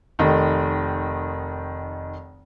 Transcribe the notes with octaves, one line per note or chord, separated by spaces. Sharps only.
F1 D#3